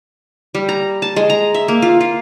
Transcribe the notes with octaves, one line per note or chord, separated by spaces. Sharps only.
G3
A#5
A5
G#3
A#5
E5
A#3
F4
F4